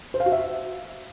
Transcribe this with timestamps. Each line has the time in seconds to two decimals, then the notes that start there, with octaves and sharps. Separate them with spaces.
0.14 C5
0.20 F5
0.26 F#4
0.32 E5